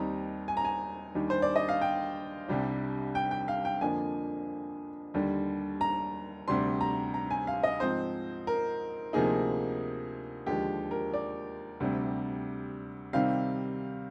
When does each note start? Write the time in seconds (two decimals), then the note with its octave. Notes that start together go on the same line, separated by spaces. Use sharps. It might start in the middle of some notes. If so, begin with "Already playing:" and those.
Already playing: D#2 D#3 G3 C4 D#4 A#5
0.48 G#5
0.57 A#5
0.65 G#5
1.15 D#2 D#3 G3 D4
1.30 C5
1.42 D5
1.56 D#5
1.69 F5
1.81 G5
2.48 C2 C3 G3 D4
3.15 G5
3.31 G5
3.48 F5
3.65 G5
3.81 F2 D3 F3 A#3 D4 G#5
5.14 D#2 D3 G3
5.81 A#5
6.48 D2 C3 G3 D4 C6
6.81 A#5
7.14 A#5
7.31 G#5
7.47 F5
7.63 D#5
7.80 G#2 F3 C4 D#4 C5
8.47 A#4
9.13 D2 C3 F3 A#3 D#4 G#4
10.47 D#2 D3 F3 G#3 G4
10.91 A#4
11.14 D5
11.80 D2 C3 G3
13.13 C3 D#3 G3 C4 F5